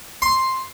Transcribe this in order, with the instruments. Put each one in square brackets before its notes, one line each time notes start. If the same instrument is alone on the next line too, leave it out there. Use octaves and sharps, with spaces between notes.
[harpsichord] C6